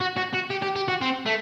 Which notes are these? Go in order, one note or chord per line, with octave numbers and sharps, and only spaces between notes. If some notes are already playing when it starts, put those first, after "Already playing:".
F#4
F#4
F#4
G4
G4
G4
F#4
C4
A3